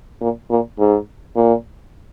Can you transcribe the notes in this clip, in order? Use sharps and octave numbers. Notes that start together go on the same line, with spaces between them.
A#2
A#2
G#2
A#2